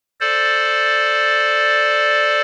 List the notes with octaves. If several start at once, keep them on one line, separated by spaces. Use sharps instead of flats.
A4 C5 D5